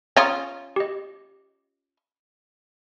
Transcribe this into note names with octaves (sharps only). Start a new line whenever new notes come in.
C#4 F4 A#5 D#6
G4 D#5